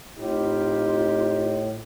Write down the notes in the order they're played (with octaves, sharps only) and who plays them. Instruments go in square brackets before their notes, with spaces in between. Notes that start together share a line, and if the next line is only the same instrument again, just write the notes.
[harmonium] A2 [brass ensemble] C4 D#4 G4 [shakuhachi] F4